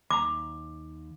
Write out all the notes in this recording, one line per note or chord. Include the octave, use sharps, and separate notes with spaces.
D#2 A#5 D6